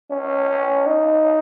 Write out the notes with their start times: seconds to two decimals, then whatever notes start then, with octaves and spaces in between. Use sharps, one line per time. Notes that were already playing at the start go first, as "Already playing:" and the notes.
0.10 C#4
0.86 D#4